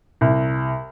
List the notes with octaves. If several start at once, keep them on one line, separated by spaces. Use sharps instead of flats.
C2